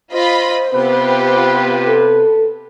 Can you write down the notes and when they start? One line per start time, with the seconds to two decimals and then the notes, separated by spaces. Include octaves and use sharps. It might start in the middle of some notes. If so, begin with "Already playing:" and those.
0.12 F4 C5 D#5 B5
0.73 C3 B3 F4 G4 B4
1.87 A4